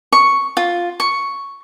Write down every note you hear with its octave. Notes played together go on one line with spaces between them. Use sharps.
C#6
F4
C#6